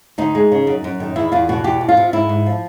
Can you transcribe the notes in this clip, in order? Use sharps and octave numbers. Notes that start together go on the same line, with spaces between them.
D2 D#4
G#3
C#3
F#2
F#2
D#3
E2 E4
E2 F4
B2 F#4
E2 G4
E2
F4
C3
G#2 E4
G#2
F3